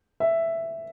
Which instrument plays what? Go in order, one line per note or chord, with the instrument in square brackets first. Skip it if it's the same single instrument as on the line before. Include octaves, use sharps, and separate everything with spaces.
[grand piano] E5